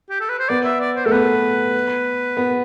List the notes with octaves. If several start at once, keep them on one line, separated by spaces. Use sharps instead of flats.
G4
A4
B4
C5
B3 D5
E5
D5
C5
A3 A4
B3 B4
B3